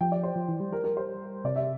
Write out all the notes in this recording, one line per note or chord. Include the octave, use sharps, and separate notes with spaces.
F3 G5
D5
C5
F3
E3
G3
A#4
A#4
C5
C3 D5
E5